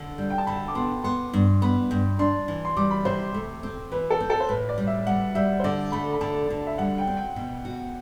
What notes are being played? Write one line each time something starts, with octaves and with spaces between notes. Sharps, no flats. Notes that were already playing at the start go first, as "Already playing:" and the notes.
Already playing: D3
G3
G5
A5
D3 B5
D6
B3 C6
B3 C6
G2
B3 B5
G2
D4 C6
E3
C6
G3 D6
B5
C3 C5
A3
C4
E3 B4
A4
C4
A4
C5
A2 B4
D5
G3
E5
G3 F#5
G3 E5
C5
D3 D5
A3 B5
B5
D3 A5
D3
E5
G3 F#5
G5
C4
G5
B2
F#4